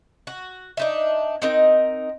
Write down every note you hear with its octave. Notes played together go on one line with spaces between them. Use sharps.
F#4
D4 D#4 E5
C4 D#4 A#4